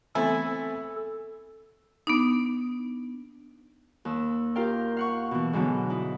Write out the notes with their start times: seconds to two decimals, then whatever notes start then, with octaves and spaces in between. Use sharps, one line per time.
0.15 E3 A3 B3 C4 E4 A4 G#5
2.07 B3 D4 D#4
4.05 D#2 E6
4.55 F4 G4 A#4 F5 G5
4.97 F5 F#5 C#6
5.31 B2 E3
5.53 G#2 B2 D3 F#3
5.90 D#4 E4